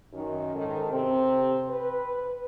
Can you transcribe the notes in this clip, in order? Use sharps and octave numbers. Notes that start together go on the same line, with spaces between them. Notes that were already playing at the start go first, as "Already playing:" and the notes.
F#2 D#3
G#2 D#3 A4
C3 C4
B4